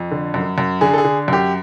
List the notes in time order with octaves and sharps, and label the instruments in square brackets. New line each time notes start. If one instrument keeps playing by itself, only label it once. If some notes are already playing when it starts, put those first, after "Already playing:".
Already playing: [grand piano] F2
D3
F#2
F#2
D3 G#4
A4
G#4
D3
F#2 G4